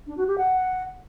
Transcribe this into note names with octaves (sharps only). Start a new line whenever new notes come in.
D4
F#4
G4
F#5